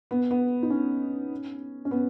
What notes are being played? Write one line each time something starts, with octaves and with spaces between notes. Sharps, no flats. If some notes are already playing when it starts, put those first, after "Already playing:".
B3
B3
D#4
C#4
C#4
B3